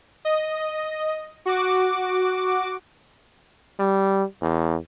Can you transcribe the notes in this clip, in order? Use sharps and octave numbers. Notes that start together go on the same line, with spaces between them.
D#5
F#4 D6
G3
E2